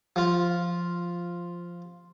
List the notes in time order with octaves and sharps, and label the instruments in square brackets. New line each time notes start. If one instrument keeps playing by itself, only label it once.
[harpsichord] F3 F4